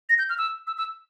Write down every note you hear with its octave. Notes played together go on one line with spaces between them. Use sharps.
A#6
G6
F6
E6
E6
E6